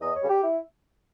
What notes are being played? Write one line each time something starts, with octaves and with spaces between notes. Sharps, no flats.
E2 D#5
C#5
C#3 G3
G4
E4